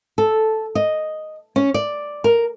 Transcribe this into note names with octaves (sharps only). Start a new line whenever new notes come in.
A4
D#5
C#4
D5
A#4